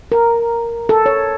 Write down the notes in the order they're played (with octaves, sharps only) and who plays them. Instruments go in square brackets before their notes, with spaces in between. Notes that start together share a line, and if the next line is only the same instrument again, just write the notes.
[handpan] A#4
A4
C#5